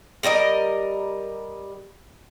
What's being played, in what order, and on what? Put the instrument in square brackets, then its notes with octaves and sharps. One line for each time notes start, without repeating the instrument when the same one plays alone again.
[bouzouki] G3 A#4 D5 D#5